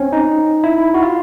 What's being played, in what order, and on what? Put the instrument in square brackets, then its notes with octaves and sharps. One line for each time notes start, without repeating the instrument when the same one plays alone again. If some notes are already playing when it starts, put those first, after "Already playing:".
Already playing: [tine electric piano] C4 C#4
D#4
E4
F#4
F4